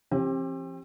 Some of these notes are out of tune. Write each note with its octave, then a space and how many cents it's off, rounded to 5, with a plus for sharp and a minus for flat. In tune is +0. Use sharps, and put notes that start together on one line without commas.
F3 -45 C4 +35 G4 +10